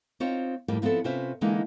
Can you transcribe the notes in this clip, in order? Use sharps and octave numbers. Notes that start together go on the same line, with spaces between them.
C4 D#4 F4 C5 C#5
F2 A2 F3 G3 A#3
F3 B3 C4 E4 A4
C3 C#4 F4 B4 C5 E5
D3 E3 G#3 A#3 D#4